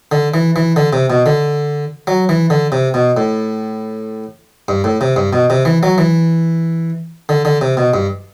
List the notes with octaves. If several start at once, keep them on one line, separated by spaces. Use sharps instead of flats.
D3
E3
E3
D3
C3
B2
D3
F#3
E3
D3
C3
B2
A2
G2
A2
C3
G2
B2
C3
E3
F#3
E3
D3
D3
C3
B2
G2